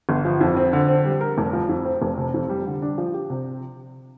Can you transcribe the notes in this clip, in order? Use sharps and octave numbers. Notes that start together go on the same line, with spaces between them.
G1
F3
F2
C4
D3
C4
G3
A#4
F1
F3
F2
C4
F1
C3
F2
G3
D3
D4
F3
G4
C3